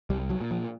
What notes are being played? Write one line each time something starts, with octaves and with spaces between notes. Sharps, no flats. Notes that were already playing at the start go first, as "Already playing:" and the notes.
C2 G3
F#3
A#2
F3